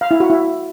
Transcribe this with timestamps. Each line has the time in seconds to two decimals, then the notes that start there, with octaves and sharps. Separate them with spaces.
0.01 F5
0.11 E4
0.20 F#4
0.30 E4